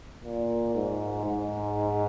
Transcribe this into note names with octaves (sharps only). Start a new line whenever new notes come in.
A#2
G#2
G#2